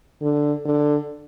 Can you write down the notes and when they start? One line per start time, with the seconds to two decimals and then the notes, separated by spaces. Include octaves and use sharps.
0.22 D3
0.65 D3